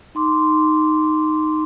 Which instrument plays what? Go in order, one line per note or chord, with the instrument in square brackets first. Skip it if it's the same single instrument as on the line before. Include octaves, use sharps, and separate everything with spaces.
[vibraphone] D#4 C6 D6